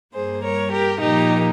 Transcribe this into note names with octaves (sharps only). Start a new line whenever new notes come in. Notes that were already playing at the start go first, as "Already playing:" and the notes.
G2 G3 A#3 G#4 C5
A#4 C#5
G4 A#4
A#2 F3 A#3 D#4 G4